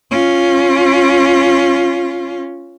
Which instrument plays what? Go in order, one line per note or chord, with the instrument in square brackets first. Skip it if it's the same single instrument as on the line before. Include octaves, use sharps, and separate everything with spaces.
[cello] C#4 F4